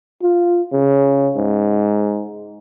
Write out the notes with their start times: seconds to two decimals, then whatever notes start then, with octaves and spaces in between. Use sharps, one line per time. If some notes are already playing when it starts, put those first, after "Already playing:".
0.22 F4
0.72 C#3
1.36 G#2